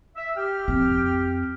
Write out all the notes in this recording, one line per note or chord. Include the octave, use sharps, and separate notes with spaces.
E5
G4 G5 F6
F2 C4